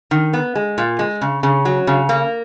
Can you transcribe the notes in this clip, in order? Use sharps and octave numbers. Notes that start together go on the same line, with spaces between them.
D#3
B3
G#3
A#2
G#3
C#3
C#3
F#3
C#3
A#3